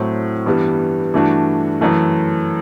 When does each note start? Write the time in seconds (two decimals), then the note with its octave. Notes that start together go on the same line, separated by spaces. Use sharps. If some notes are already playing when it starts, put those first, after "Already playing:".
Already playing: A2 F#3 A3 C4
0.46 G2 E3 G3 B3
1.13 G2 E3 A3 D4 F#4
1.81 F#2 E3 A3